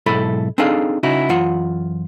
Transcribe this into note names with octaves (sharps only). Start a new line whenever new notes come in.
B1 G#2 E4 A4 B5
C4 D4 D#4 G#4 A4 F5
C#3 D#4 E4 F#4
F#2 E3 F4 F#5